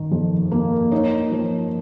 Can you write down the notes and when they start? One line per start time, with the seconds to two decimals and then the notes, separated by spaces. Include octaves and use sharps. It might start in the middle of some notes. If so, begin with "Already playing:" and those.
Already playing: D#3
0.12 F2
0.51 A#3
0.91 D#4 C#5
1.32 F3